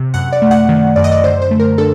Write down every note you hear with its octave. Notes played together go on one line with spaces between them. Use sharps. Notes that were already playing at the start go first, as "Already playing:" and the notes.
Already playing: C3
F#2 F#5
D5
A3
F#5
D#3
F#2 D5
D#5
D5
D3 C5
C5
A3
A#4
D4 A4